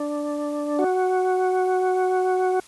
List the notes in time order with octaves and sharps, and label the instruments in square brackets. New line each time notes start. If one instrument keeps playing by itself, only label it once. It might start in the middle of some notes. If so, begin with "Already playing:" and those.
Already playing: [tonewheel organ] D4
F#4